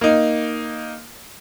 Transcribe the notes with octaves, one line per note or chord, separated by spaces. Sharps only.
A#3 D#4